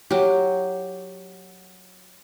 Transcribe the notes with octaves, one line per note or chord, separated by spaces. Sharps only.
F#3 G4